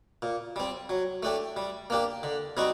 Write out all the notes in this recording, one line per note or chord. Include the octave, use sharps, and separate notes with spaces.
A#2
G3 C4
F#3
A3 D4 G4
G3
A#3 D4 G4
D3
G3 C4 D#4 F#4